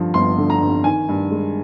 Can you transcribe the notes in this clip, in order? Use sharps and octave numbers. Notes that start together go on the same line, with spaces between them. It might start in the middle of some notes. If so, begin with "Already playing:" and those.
Already playing: G2 D3 F3
G1 C6
D3
A#5
G2
D#3 G#5
G2
G#3